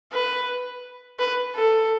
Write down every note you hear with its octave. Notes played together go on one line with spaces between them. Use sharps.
B4
B4
A4